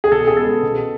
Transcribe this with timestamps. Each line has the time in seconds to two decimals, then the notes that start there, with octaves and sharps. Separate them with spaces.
0.04 G#4
0.12 B2 A4
0.27 G#4
0.37 G#3 B3 A4
0.63 B2